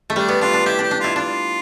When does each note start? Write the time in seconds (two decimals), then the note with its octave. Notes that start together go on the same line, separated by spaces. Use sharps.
0.10 A3
0.16 G3 D4
0.28 B3
0.41 D4 F4
0.53 D4
0.66 E4 G4
0.79 D4 G4
0.91 D4
1.00 E4 F4
1.16 D4 F4